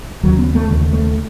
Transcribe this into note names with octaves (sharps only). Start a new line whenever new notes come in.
D#2 C#3 F#3
B3
A3
D#2 C#3 A3
A3